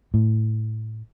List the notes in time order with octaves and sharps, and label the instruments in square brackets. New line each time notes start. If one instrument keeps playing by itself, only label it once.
[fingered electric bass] A2